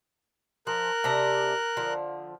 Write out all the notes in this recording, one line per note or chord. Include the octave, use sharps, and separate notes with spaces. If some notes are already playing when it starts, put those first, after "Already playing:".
F3 A#4 F#6
C3 D4 A#5
D3 F3